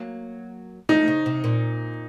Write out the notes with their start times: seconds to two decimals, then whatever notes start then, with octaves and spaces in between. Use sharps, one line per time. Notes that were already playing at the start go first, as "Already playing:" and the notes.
Already playing: F#3 A#3
0.89 F3 A3 D#4
1.08 C#3
1.26 C3
1.44 A#2